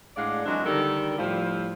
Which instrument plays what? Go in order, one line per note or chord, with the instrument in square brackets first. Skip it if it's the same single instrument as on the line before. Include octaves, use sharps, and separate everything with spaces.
[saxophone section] A2 G#3 D4 D5 F5 F#5
E3 F#3 G#3 A3 C4 D4
D3 D#3 G3 A4 A#4
A2 F3 G3 E4 F4 C5